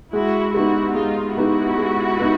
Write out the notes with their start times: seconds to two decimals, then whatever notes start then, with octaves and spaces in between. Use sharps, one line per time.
0.13 G#3 E4 F#4
0.54 B3 D#4 E4 F#4 G4
0.95 G#3 D#4 F4
1.36 B3 D#4 E4 F#4 G4
1.77 G#3
2.19 B3 D#4